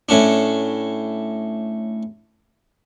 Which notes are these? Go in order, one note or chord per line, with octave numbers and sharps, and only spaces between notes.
A2 C#4 D4